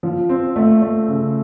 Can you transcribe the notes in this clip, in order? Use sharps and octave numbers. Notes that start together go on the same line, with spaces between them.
F3
C4
A3
A3
C#3